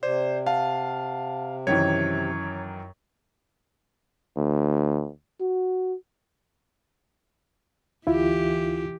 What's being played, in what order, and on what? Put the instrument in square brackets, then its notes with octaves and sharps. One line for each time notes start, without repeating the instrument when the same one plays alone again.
[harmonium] C3 [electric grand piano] C5 [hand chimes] D5
[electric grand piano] F5 [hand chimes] F#5 A5
[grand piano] F#2 D#3 E3 [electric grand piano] C#5 [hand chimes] G#6
[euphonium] D2
F#4
[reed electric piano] D2 E4 F4 [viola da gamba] E3 G4